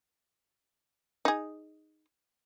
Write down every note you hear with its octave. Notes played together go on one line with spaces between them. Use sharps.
D#4 G#4